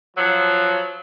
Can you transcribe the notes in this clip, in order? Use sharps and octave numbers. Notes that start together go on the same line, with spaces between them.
F3 F#3